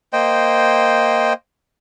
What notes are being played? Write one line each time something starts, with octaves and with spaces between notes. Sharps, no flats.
A#3 C5 D#5 G5